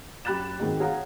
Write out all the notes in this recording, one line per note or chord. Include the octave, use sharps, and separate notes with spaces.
F#2 G4 B5 F#6 A6 E7
G#2 D#3 G#3 C4 D#4 F#4
G#4 C#5 F5 F#5 A#5